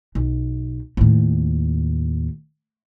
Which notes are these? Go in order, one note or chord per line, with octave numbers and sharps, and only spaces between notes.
B1
D#2 A2